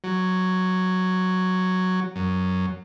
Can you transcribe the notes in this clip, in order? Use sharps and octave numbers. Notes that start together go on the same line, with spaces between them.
F#3
F#2